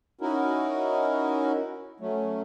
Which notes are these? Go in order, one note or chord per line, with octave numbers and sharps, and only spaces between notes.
C#4 D#4 E4 F#4 A#4
F#3 A3 C#4